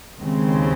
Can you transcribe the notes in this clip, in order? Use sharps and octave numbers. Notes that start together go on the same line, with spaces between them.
D#2 C#3 G#3 C4